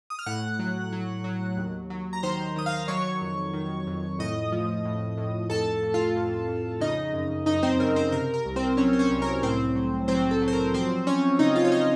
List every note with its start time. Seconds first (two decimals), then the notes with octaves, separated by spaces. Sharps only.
0.10 D#6
0.19 F6
0.26 A2 F#5 F#6
0.59 F#3
0.92 F#3
1.24 F#3
1.57 D#2
1.90 F#3
2.13 A#5
2.23 D#3 C5 C6
2.56 D#3 D#6
2.66 F5 F6
2.88 F#3 C#5 C#6
3.22 F2
3.53 D#3
3.87 F2
4.19 A2 D#5 D#6
4.52 F3
4.85 A2
5.17 A2
5.50 F2 A4 A5
5.82 F2
5.94 F4 F5
6.16 F2
6.48 F2
6.81 C#3 D#4 D#5
7.13 F#2
7.46 F#2 D#4 D#5
7.63 C4 C5
7.79 C#3 A#4
7.96 C4 C5
8.12 C3 A#4
8.34 A#4
8.45 C2
8.56 C4 C5
8.77 F#3 C#4 C#5
8.93 C5
8.99 C#4 C#5
9.11 C2
9.22 A#4
9.42 A2 C4 C5
9.75 F#3
10.08 F#3 C4 C5
10.31 A4
10.42 F#3
10.48 C5
10.53 A#4
10.74 F3 C4 C5
11.07 F3 C#4 C#5
11.39 C#3 D#4 D#5
11.56 F4 F5
11.64 C#5
11.72 D#4 D#5